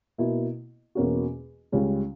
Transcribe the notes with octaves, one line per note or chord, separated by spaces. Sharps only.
B2 A#3 E4
E2 B2 A#3 C#4 F#4
C#2 C#3 G3 C#4